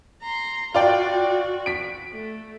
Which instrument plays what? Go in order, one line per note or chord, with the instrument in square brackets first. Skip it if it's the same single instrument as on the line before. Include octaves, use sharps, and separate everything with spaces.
[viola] A#5 C6
[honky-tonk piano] F4 D5 G5 [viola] F#4
[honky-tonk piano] B6 D7
[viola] A3